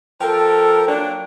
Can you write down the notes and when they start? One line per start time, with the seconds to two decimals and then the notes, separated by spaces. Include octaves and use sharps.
0.21 F3 C4 A4 A#4 G5
0.87 F#3 A#3 D4 G5